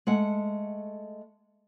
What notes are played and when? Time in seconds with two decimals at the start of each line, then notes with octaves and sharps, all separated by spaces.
0.07 G#3 A3 F#5